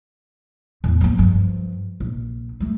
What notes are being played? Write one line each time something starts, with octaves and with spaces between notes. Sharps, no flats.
E2 A2
F3 A#3
G2 F3
A#1
G3 A3